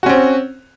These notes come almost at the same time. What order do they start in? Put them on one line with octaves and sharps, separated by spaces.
F#4 C#4 C4